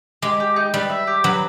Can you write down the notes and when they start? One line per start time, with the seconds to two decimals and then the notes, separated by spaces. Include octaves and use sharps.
0.22 G#3 G4
0.40 G4
0.56 D#4
0.74 G3 B4
0.90 E5
1.07 G4
1.24 F#3 B4